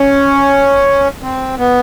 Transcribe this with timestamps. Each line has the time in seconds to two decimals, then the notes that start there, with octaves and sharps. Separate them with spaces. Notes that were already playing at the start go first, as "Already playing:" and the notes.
Already playing: C#4
1.23 C4
1.58 B3